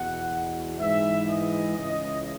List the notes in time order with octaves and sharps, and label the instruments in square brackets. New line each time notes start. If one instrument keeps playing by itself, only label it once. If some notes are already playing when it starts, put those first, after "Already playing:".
Already playing: [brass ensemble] E2 B2 F#5
G#2 E3 E5
D#5
C#2 C#3 E3 D#5